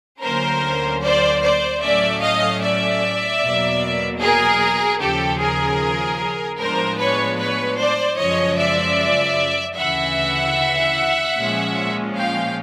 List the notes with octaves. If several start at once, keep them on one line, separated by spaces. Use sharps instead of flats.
D2 D3 F#3 A#3 C#4 A#4 C5
C5 D5
C5 D5
A2 F#3 A3 C#4 D5 E5
D#5 F5
D5 E5
E2 B2 F#3 A#3
G#4 A#4
D#2 C#3 F3 G4 A4
G#4 A#4
A2 F3 G#3 B3 D4 A#4 C5
B4 C#5
B4 C#5
C5 D5
F#2 C#3 F3 G#3 C#5 D#5
D5 E5
D2 C#3 E3 E5 F#5
A#2 F3 G#3 C#4
F5 G5